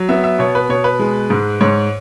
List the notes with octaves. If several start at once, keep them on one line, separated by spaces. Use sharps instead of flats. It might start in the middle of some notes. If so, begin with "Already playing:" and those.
Already playing: F#3
B3 E5
E5
B2 C#5
B4
B2 C#5
B4
G#3
G#2
G#2 C#5